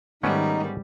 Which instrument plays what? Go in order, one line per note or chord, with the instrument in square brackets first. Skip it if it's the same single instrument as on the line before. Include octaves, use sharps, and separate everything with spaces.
[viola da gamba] G#2 G3 [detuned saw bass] D#3 [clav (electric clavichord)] A3 B3 C#4 [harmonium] D#4